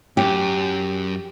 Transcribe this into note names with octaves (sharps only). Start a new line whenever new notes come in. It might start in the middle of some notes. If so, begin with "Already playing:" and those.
F#2 G4